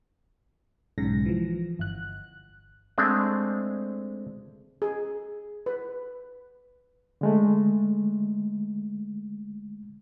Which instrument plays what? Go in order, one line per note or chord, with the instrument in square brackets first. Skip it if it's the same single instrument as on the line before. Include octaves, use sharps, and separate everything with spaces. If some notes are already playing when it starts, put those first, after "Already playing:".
[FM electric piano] B1 G#2 C#3 A#6
E3 F3
G1 F#6
[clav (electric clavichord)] G#3 A3 C4 D4
[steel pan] G#4
B4
[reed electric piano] D3 G#3 A3